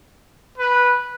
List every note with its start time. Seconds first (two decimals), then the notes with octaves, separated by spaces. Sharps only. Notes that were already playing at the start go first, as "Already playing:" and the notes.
0.58 B4